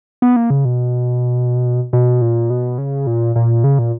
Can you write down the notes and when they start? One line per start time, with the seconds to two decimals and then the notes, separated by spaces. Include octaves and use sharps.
0.22 B3
0.36 A#3
0.50 C#3
0.65 B2
1.93 B2
2.21 A#2
2.50 B2
2.78 C#3
3.07 A#2
3.36 A#2
3.64 C#3
3.79 A#2